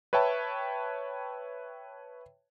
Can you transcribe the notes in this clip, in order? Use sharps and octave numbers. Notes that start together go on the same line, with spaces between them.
B4 C#5 E5 G5 A5